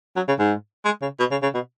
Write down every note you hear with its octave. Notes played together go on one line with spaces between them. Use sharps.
F#3
C#3
G#2
G#3
C#3
B2
C#3
C#3
B2